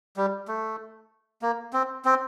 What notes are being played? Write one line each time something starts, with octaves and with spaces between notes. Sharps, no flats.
G3
A3
A#3
C4
C4